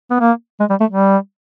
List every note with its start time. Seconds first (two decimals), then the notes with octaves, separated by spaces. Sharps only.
0.11 B3
0.20 A#3
0.60 G#3
0.70 G3
0.80 A3
0.90 G3